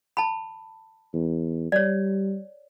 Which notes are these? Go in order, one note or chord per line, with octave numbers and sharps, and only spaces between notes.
A5 B5
E2
G3 C#5 D5